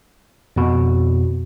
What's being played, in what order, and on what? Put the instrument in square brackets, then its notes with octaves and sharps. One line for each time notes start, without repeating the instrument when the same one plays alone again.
[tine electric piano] F2 B2